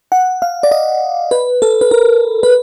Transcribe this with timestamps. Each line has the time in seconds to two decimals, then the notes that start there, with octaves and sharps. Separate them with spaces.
0.12 F#5
0.42 F5
0.63 D5
0.71 D#5
1.31 B4
1.62 A4
1.81 B4
1.91 A#4
2.43 B4